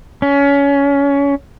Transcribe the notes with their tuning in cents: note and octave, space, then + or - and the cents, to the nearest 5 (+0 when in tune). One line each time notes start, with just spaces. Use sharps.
C#4 +25